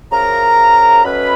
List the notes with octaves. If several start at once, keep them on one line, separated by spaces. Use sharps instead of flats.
F#2 C#3 F3 A#4 A#5
B2 F#3 A3 C#4 B4 B5